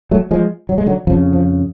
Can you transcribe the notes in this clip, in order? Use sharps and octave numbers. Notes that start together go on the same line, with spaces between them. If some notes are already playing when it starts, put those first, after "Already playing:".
F#3 A3
F3 G#3
F#3
G#3
D3 F#3
F2 C#3 F3
F3